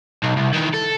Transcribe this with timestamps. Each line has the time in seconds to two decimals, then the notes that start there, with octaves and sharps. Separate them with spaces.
0.23 B1
0.36 C2
0.53 D#3 E3
0.73 A4